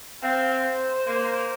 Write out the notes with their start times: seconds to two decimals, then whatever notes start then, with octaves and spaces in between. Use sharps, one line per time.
0.22 C4 F5
0.65 C5
1.07 A#3